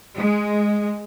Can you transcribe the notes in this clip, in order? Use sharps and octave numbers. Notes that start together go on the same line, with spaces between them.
G#3